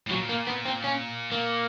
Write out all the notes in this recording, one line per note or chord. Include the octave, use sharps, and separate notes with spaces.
A2
A#2 F#3
A#3
B3
C4
C#4
A#3